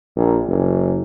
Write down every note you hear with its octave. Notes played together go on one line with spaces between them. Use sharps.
A#1
F#1